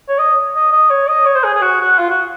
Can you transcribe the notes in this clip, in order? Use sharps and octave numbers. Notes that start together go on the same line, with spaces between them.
C#5
D#5
D#5
D#5
C#5
D#5
C#5
C5
G#4
G#4
F#4
F#4
F4
F#4